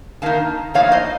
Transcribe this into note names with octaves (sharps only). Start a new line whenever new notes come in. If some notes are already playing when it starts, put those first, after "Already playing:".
D#3 A#3 D#4 F5 A5
A2 F3 A#3 D#4 C#5 F5
C5 D#5